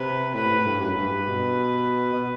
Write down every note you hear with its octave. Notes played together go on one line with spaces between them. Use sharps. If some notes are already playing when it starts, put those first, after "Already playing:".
Already playing: C3 B4
A2 B4
A2
G2
F#2 B4
G2
G2
B2
B2